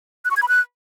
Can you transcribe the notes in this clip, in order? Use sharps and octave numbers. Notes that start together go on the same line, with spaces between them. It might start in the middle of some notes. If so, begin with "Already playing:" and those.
F#6
C#6
G#6
B5
F#6